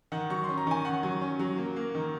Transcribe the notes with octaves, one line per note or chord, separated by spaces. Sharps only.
D#3 F#5
F#3 C#6
C#4 C6
A#5
D#3 G#5
C#4 F#5
F#3
C#4
F#3
A#3
A#3
D#3